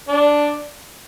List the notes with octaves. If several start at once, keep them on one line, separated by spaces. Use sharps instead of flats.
D4